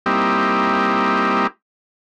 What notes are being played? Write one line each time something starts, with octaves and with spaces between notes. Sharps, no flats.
G3 A#3 C4 D#4 E4 G4